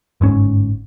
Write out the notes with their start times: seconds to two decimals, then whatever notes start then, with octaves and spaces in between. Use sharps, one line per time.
0.21 G1 G#2 C#4